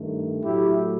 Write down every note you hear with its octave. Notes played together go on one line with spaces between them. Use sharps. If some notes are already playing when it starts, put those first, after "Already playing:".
Already playing: G2 D#3 A3
A2 F#3 A3 E4 G4